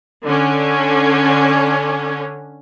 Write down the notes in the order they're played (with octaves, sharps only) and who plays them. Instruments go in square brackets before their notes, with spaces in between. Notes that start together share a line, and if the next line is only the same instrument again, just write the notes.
[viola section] D3 C#4